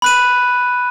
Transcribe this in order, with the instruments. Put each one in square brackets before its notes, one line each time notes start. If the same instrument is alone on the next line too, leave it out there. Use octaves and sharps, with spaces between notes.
[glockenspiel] B5 F#6 D#7